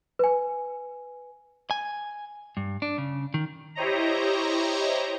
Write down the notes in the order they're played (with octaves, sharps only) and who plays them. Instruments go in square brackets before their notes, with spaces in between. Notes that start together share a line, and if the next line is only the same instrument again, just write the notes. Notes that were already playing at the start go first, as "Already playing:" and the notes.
[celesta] B4 G#5
[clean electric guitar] G#5
G2
D4
C#3
D#3
[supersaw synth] E4 G4 C5 C#5 D#5 A#5